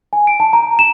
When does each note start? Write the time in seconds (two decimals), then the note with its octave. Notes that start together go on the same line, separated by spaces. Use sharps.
0.13 G#5
0.27 D7
0.40 A5
0.53 A#5
0.79 E7